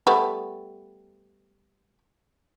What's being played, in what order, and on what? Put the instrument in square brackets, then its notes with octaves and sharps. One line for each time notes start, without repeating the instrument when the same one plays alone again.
[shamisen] G3 A3 B3